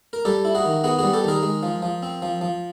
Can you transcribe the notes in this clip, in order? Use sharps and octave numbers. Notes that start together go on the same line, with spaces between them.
A#4
G3 G4 A4
E4
F#4 G#4
D#3
B3 F#4 G#4
G3 F#4 G#4
G4 A4
D#3 G#4 A#4
G#3
F3
F3
C4
F3
F3